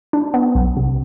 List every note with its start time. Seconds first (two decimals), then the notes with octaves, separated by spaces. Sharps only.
0.13 D4
0.34 B3
0.55 B1
0.77 C3